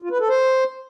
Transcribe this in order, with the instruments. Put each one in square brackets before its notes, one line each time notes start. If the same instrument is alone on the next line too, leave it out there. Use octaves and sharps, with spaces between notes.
[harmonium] F4
B4
A4
C5